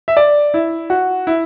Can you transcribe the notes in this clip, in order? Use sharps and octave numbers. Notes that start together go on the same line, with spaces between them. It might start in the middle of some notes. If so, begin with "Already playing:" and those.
E5
D5
E4
F#4
E4